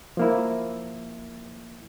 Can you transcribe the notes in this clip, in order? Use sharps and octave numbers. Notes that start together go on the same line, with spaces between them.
F3 A#3 E4